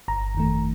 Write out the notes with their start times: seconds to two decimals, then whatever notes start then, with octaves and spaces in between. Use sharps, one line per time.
0.08 G1 A#5
0.35 F2 D#3 A3